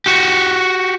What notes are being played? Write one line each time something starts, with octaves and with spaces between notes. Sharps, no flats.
F#4 G4